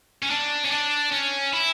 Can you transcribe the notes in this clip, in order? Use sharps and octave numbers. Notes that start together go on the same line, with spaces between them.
C#4
D4
C#4
D4
C#4
E4